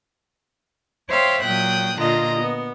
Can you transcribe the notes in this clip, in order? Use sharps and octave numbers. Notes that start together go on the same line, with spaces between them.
C5 C#5 E5 F5 G5 C6
A#2 F#3 G5 D#6 F#6
A#2 D3 F4 D#5 A#5
B3